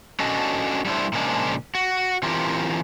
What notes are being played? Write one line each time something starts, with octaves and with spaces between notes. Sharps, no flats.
C#4 D4 F#4 A4 D#5
G3 A3 D4 E4 C5
A#2 C#3 F3 G#3 D4
F#4
E3 C4 F4 G4 A#4